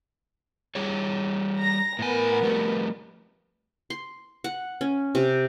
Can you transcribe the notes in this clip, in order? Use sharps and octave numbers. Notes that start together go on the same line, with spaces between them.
G3 G#4 C#5
A#5 A#6
A2 B3 A#4 G#5
F3 G3 A3
C6
F#5
C#4
C3